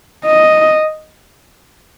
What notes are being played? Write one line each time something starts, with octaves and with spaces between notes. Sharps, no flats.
D#5